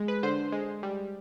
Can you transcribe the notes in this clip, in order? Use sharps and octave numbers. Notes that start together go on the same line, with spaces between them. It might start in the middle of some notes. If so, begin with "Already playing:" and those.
Already playing: G#3
B4
D3 C5
G#3
G3